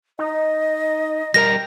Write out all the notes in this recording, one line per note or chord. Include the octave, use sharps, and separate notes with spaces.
D#4 D#5
G3 A#4 G5 A#5 A#6